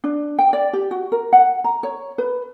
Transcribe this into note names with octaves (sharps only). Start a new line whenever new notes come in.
D4
G5
D5
G4
F#4
A#4
F#5
A#5
C#5
B4